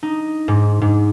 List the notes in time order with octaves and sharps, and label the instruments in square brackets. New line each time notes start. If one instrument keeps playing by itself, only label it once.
[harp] D#4
G#2
G#2